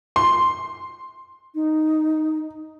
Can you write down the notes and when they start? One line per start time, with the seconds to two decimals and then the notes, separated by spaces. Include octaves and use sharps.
0.16 C6
1.55 D#4